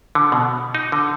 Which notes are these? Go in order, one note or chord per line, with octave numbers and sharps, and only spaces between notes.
D3
B2
D#4
D3